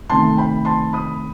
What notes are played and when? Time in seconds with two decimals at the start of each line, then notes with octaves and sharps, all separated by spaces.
0.09 C3 D#3 A3 A5 C6
0.37 G5 B5
0.65 A5 C6
0.93 B5 D#6